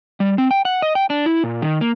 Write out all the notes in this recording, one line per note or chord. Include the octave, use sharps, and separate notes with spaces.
G3
C4
G5
F#5
D#5
G5
D4
E4
A#2
D#3
A#3